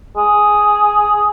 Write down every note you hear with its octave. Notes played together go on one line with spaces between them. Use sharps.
G#4